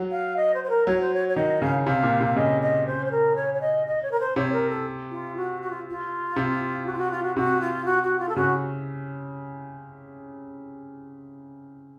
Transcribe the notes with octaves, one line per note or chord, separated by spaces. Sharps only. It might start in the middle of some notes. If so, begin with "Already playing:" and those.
Already playing: F#3
F5
D#5
C5
C5
A#4
F#3 C#5
C5
C#5
C#5
D#3 D#5
C#3 F5
C3 F5
A#2
C3
C#3 D#5
D#5
C5
C5
A#4
C#5
C#5
D#5
D#5
C#5
A#4
C5
C3 C#5
A#4
A4
F4
F#4
F#4
F4
F4
C3
F#4
F4
F#4
F4
F#4
C3 F#4
F4
F#4
F#4
F4
A4
C#3 F#4